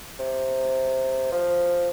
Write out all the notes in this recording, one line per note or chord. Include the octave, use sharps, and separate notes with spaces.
C3
F3